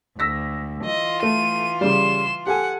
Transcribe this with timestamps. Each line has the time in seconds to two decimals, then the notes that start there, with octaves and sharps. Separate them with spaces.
0.19 D2 E6 A#6 B6
0.85 E3 F4 D#5
1.23 A3 D#7
1.81 C#3 G3 C6 E7
2.47 G4 A4 F#5 G#5